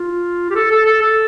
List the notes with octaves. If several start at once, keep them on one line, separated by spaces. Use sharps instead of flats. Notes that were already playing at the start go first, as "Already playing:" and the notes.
Already playing: F4
G4
A4
A4
A4
A4